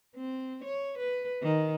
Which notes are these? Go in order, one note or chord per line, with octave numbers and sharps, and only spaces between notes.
C4
C#5
B4
D#3